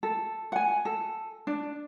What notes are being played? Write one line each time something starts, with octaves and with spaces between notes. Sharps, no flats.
A4
F#5 G#5
A4
D4